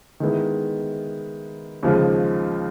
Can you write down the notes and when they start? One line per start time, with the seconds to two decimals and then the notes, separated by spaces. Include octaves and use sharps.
0.20 D#3 G#3 B3 E4
1.83 D#2 C#3 F3 G#3